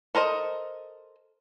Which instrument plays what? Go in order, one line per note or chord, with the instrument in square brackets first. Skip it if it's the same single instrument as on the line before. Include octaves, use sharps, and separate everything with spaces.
[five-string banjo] A4 A#4 C5 D#5